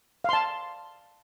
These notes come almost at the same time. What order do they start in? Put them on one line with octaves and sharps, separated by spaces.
F5 C6 A5